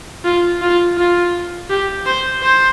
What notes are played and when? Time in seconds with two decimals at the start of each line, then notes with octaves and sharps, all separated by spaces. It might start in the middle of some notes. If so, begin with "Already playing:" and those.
0.25 F4
0.62 F4
0.97 F4
1.70 G4
2.06 C5
2.43 C5